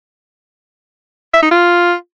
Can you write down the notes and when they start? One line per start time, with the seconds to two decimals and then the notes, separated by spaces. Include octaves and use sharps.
1.34 E5
1.43 D#4
1.51 F4